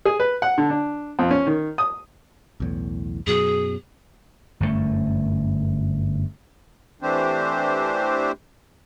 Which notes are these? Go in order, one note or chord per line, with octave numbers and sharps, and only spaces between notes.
G#4
B4
F#5
D3
D4
F2
C#4
D#3
D#6
B1 E2 A2
F#2 B2 F#3 G#4
G1 F#2 A2 A3
E3 A3 C4 D4 G4 C5